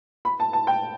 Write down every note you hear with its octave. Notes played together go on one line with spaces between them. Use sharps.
B5
A5
A5
G5